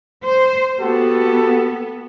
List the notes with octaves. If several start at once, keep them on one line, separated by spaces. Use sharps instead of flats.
C5
B3 F#4 G4 A4